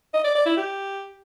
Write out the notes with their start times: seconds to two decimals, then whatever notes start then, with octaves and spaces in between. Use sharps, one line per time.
0.14 D#5
0.24 D5
0.35 D5
0.46 E4
0.57 G4